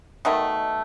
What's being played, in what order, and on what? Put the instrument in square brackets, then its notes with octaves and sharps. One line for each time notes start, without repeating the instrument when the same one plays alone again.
[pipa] B2 D#3 A3